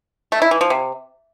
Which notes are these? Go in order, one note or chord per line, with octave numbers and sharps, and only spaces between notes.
A3
E4
E3
F3
C3